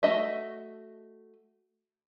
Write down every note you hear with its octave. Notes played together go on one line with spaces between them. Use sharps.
A3 F#4 D#5 E5